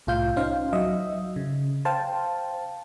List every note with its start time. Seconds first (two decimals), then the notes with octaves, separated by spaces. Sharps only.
0.07 C2 A2 F4 F5 G6
0.36 C#4 D#4 C5 F5
0.73 F#3 D#5 E5
1.36 C#3
1.85 C5 F5 G5 A5